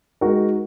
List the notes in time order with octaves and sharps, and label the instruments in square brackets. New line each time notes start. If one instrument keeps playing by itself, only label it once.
[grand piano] G#3 D#4 F#4 A#4